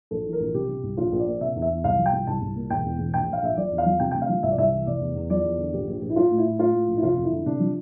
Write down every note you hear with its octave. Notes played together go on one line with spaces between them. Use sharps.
A#1 A4
E3
A#4
A#1
C3 G4
C3
C2
A#1 F4
A#1
D5
A#2
C3 E5
E2
E5
E2
C2 F5
F3
G5
C2
C2 A5
C2
A#2
E1 G5
E2
E1
A#1 G5
A#1 F5
A#1 E5
F3 D5
E2
F5
F3
C3 G5
D2 G5
F5
F3
C2 E5
D5
C2 E5
E3
F1 D5
E2
E2
F3 D5
E2
D3
A#1 G4
A#1
A#1
E4
A#1 F4
A2
E4
A2
A2 F4
A2
A#1
E4
F1 F4
F2
E4
D3
C3 D4
F3